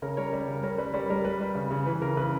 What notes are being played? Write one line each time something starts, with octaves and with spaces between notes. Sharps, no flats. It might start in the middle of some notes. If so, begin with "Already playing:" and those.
C#3 A#4 C#5
G3 A#4 C#5
G3
C#3
G3 A#4 C#5
G3 B4
G3 A#4 C#5
G3 A#4
G3 B4
G3
C#3
C#3
E3 B4
C#3 A#4
C#3 B4